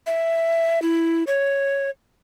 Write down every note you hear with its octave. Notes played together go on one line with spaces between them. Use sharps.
E5
E4
C#5